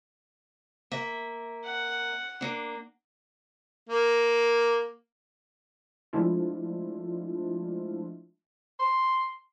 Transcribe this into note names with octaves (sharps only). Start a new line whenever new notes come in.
A#3 E5
F#5
A#3 D4
A#3
F3 G#3 A3 D4 E4 F4
C6